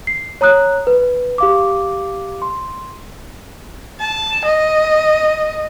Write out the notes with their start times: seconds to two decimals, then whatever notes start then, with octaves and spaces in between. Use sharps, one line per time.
0.07 C7
0.41 C#5 A#5 D#6 F#6
0.87 B4
1.38 G4 F5 D6
2.42 C6
4.00 A5
4.45 D#5